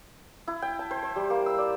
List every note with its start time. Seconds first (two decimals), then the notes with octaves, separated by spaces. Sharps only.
0.48 E4
0.62 G5
0.79 A5
0.91 C5
1.03 C5
1.16 G3
1.30 A#3
1.46 E6
1.58 D5